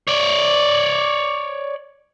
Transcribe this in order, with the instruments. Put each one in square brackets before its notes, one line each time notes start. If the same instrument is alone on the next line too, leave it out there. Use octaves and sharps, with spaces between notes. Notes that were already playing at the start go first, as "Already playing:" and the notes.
[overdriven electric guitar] C#5 D5